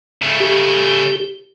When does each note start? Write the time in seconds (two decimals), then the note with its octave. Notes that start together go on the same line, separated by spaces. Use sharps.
0.22 C#3 A3
0.40 G4